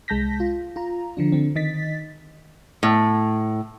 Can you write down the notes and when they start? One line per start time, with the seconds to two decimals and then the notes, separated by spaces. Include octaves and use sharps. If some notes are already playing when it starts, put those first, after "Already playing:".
0.08 C2 G#3 A5 G6 A#6 B6
0.40 F4
0.76 F4 A#5
1.17 D3 F3 D4
1.32 D3 C4
1.56 D#3 D#5 A6 B6
2.83 A2